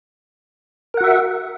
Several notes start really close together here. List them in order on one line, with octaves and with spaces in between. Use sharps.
A#4 F#5 F#4 E5